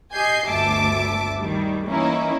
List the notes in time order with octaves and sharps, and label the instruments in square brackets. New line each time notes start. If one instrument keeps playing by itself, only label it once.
[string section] G4 D#5 G#5 G6 C7
G1 D2 E5 A5 D6
D#3 G3
E3 A#3 C#4 D#4 E4